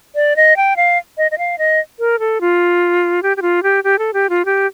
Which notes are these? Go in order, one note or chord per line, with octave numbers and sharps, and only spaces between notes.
D5
D#5
G5
F5
D#5
D#5
F5
D#5
A#4
A4
F4
G4
G4
F4
G4
G4
A4
G4
F4
G4